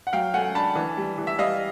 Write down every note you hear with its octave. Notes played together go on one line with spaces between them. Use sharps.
F#5
F#3 F5 G5
A3 F#5 G#5
D4 A5 B5
E3
G3
E3
E5
G3 D#5 F5